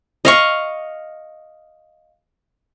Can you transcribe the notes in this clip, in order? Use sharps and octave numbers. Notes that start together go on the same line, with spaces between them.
D#5 F5 C#6